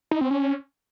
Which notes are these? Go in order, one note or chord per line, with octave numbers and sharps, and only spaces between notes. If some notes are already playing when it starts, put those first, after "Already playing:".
D#4
C4
C#4